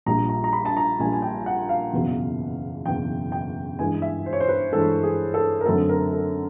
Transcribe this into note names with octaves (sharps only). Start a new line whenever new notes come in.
A#1 A#2 G3 A#5
A#5
A#5
B5
A5
A#5
A#1 A#2 G3 G#5
G#5
G5
F#5
F5
F#1 E2 B2 F#3
F#1 E2 B2 F#3 G5
G5
G2 E3 G#3 G#5
E5
C5
C#5
C5
B4
G2 E3 G#3 A4
G#4
A4
A#4
F#2 D3 F#3 A3 C4 A4
A#4
A4